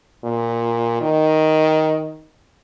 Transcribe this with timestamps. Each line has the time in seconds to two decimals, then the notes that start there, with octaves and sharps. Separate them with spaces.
0.24 A#2
1.01 D#3